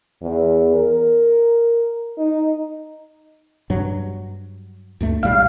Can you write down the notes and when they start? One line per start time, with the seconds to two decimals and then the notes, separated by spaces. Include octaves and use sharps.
0.22 E2
0.75 A#4
2.18 D#4
3.70 G2 F#3
5.00 D2 G2 A3
5.23 B1 A2 G3 F5